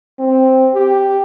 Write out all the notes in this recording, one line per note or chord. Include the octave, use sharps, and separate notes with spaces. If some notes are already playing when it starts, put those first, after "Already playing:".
C4
G4